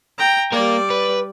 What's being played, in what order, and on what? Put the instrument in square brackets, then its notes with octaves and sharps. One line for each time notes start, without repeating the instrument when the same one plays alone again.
[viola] G5 A#5
[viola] G3 D5 [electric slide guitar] A#3 A#4
[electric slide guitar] B4